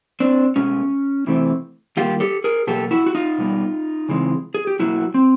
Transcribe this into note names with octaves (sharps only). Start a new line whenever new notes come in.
C4 D4
B2 G#3 B3 C#4
C3 E3 A3 C4
D#3 G3 A#3 F4 G4
G4 A4
G#4 A#4
B2 F#3 A#3 G4 A4
E4 F#4
F#4
D#4 F4
B2 G3 B3
C#3 E3 G#3 C4
G#4
G4
B2 F#3 A#3 E4 F#4
C4